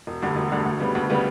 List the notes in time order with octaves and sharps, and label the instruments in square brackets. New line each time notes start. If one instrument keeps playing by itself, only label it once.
[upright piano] E1
D2 D3 G3
E1
D2 D3 G3
D2
C#3 G3 B3
D2
C#3 G3 B3